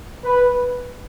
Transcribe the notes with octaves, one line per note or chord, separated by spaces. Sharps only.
B4